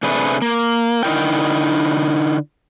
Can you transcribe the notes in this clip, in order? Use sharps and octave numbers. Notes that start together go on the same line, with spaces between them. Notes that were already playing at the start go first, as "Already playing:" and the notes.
C3 A3 D4 G#4 B4
A#3
D3 D#4 E4 A#4 G5